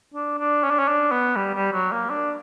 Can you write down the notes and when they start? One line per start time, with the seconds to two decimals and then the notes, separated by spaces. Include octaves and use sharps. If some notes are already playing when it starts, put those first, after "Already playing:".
0.14 D4
0.38 D4
0.64 C#4
0.70 D4
0.79 C#4
0.88 D4
1.11 B3
1.36 G3
1.55 G3
1.73 F#3
1.92 A#3
2.10 D4